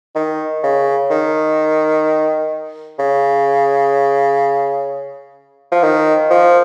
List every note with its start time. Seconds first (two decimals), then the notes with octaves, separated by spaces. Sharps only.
0.15 D#3
0.63 C#3
1.10 D#3
2.99 C#3
5.72 F3
5.83 D#3
6.30 F3